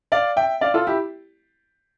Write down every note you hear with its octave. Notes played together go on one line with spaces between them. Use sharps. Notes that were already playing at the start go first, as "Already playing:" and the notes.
D5 F5
E5 G5
D5 F5
F4 A4
E4 G4